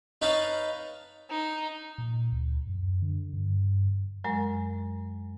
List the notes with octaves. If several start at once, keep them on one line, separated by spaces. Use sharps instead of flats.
D#4 B4 C#5 F5 A5 B5
D#4
A#2
D2
F#2
D3
G2
F#2 F#3 G#3 A#4